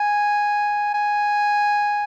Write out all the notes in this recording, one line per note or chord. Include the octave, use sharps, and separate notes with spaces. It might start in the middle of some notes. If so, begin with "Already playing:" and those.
Already playing: G#5
G#5